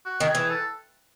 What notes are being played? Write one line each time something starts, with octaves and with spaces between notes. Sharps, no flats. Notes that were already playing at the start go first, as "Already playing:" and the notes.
F#4
D#3
G#4
E3
A4